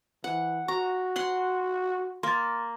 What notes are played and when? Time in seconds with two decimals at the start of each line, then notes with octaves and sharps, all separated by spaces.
0.24 E3 F#5
0.68 F#4 A#5 C#6
1.16 F#5 C6
2.23 A#3 C6 A6